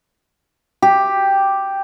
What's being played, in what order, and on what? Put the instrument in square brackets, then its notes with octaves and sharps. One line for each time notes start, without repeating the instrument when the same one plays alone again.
[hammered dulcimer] G4